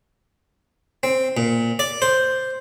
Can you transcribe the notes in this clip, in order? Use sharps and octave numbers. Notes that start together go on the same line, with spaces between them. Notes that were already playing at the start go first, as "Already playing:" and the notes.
C4
A#2
D5
C5